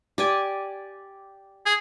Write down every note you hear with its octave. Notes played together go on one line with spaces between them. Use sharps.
G4 D5 G#5
G#4